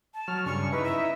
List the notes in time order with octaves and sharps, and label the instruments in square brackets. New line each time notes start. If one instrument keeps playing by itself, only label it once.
[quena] A5
[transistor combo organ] F#3 F6
[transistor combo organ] G2 C#3 [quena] C#6
[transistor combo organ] D#4 E4 [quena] B4
[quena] E5